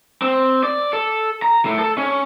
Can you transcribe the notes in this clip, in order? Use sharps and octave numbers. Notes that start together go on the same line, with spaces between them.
C4
D5
A4
A#5
A2
A4
C#4